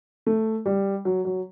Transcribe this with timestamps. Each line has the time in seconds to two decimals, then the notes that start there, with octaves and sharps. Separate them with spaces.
0.26 A3
0.66 G3
1.05 F#3
1.25 F#3